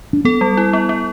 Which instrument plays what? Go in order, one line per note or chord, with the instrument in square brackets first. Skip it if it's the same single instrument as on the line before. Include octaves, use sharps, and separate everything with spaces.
[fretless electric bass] D4
[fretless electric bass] B3 [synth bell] A4
[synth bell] G3
E4
B3
B3